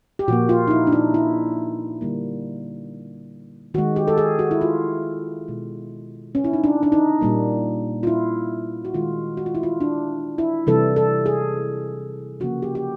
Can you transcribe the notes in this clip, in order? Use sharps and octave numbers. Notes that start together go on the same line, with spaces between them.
G4
A#2 F3 A#3 F#4
F4
D#4
E4
D4
D#4
E4
D3 G3 A#3
D#3 G#3 F#4
G4
A4
G#4
F#4
E4
F4
B2 G#3
C#4
E4
D#4
D4
D4
D#4
A#2 G3 A#3
F4
E4
F#4
D#3 G#3 F4
F#4
F4
E4
F4
D4
E4
C3 E3 G3 A4
A4
G#4
C#3 F3 A#3 F#4
G4
G4